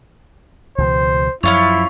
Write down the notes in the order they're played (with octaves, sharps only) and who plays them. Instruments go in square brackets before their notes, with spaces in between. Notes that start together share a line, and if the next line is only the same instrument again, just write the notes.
[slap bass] C#2 B2 E3 [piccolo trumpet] C5
[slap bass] F#2 F3 [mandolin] C#4 F4 C#5 [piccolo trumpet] E4